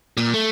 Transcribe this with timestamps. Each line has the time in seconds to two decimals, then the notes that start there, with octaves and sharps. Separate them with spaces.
0.17 A#2
0.34 A3